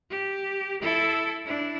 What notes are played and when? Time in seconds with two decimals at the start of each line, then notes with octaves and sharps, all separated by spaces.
0.10 G4
0.81 E4 A4
1.46 D4 E4